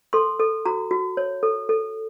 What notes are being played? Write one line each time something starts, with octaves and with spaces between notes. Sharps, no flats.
A4 C6
A4
F#4 A#5
F#4
C#5
A4
A4